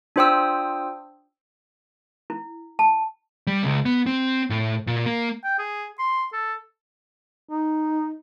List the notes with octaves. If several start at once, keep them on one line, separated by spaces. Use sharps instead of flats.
D4 F4 C5 G5 D#6 E6
E4
A5
G3
C#2
B3
C4
A2
A#2
A#3
G5
G#4
C6
A4
D#4